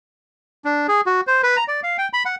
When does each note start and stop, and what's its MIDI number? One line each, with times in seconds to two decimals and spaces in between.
0.65 0.87 62
0.88 1.01 68
1.06 1.21 66
1.27 1.42 72
1.43 1.57 71
1.57 1.64 82
1.68 1.80 74
1.83 1.97 77
1.98 2.08 79
2.13 2.23 83
2.25 2.36 78